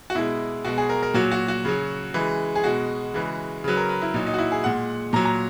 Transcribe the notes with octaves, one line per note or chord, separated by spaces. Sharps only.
F#4
B2 G#3 E4
B2 G#3 F#4
G#4
A#4
A#4
A#2 F#3 F#4
F#4
F#4
C#3 F#3
C#3 E3 G#3
G#4
B2 G#3 F#4
C#3 E3 G#3
C#3 F#3 B4
A#4
B4
E4
A#2 F#3 D#4
D#4
F#4
E4
G#4
A#2 G#3 F#5
A#2 F#3 A#5
A#5